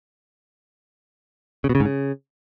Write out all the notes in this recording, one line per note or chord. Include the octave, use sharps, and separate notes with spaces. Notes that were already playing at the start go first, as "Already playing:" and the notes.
C#3
B2
C#3
G#2
C#3